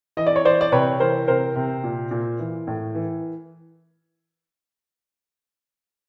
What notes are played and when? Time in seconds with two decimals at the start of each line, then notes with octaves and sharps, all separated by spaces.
0.17 E3 D#5
0.27 D5
0.36 C#5
0.45 E3 C5 D5
0.61 D5
0.72 C3 B4 C#5
1.00 E3 A#4 C5
1.28 C3 A#4 C5
1.56 C3
1.84 A#2
2.11 A#2
2.39 E3
2.67 A2
2.95 E3